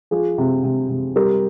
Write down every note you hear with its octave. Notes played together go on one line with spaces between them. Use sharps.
F3 F4 G#4
C3
C3
C3
G3 G4 A#4